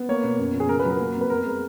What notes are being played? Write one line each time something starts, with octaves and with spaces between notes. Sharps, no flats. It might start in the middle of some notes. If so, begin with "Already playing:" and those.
Already playing: B3
A#3 C#5
B2
F#2
F3
G#4
C#3 A#4
B4
F#3
A#4
A#3
F2
B4
B3 A#4
G#3